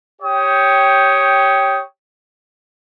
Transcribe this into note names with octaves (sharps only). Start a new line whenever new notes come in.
G4 C#5 G5 D#6